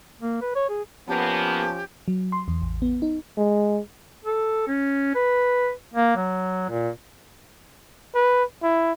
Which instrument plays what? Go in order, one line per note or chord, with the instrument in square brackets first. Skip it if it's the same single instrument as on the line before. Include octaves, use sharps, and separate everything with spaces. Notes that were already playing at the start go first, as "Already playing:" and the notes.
[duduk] A#3
B4
C#5
G#4
[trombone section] F3 C#4 [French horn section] A#3 B3 [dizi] G4 [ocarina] A5
[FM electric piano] F#3
C6
E2
A1
B3
D#4
[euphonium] G#3
[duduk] A4
C#4
B4
A#3
F#3
A#2
[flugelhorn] B4
E4